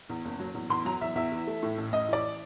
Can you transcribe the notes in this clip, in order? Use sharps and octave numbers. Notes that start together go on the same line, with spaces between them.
E2
F#1
F#3
E2
E2 C6
F#3 A#5
E2 E5
E2 E5
E3
A3
A2
A1
A1 D#5
E3 D5